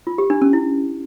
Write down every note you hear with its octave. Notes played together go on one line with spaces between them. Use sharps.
F4
G4
D4
C#4
E4